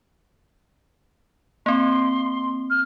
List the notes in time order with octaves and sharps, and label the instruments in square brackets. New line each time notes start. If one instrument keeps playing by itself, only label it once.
[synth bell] A#3 C4 [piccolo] C6
[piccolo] F6